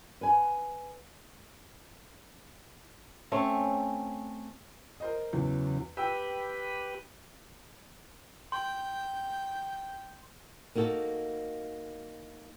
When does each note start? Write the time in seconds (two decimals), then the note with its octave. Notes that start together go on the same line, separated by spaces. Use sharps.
0.21 B4 G#5
3.32 A3 C4 C#4
5.00 A#4 C5 D#5
5.33 E2 C#3 E3 F#3
5.97 G4 B4 G5 E6
8.52 G5 C6
10.75 A#3 D#4 F#4 A4